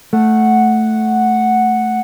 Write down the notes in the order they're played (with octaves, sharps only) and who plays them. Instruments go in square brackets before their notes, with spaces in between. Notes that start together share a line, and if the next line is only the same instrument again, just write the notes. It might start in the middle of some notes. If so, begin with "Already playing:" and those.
[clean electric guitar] A3 [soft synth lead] F#5